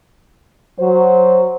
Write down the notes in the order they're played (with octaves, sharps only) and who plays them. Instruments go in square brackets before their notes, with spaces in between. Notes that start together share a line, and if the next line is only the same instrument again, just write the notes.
[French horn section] F#3 C5